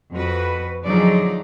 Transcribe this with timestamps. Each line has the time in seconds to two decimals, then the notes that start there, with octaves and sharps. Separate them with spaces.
0.12 F2 F#4 B4
0.84 D3 F3 F#3 D#4 G#4 D5